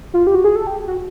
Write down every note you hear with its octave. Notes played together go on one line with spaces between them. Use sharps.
F4
G4
F#4
G#4
A4
G4
F#4